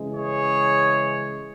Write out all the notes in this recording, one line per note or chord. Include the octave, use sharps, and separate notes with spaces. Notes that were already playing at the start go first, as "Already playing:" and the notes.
Already playing: C#3 E3 G#3
G#4 C#5